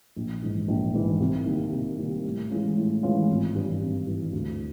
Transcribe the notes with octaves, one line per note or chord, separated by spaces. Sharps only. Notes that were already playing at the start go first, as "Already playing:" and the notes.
A#1
G#2 E3
A#1
G#2 E3
C2
C3 D#3 G3 A#3
C2
C3 D#3 G3 A#3
A2
E3 G#3 C#4 F4
A2
E3 G#3 C#4 F4
G#1
G2 E3
G#1
G2 E3
D2